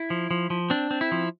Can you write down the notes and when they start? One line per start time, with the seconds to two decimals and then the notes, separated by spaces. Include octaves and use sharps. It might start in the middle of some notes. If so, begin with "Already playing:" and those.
Already playing: E4
0.10 F3
0.31 F3
0.50 F3
0.70 C4 D4
0.91 C4
1.01 E4
1.12 F3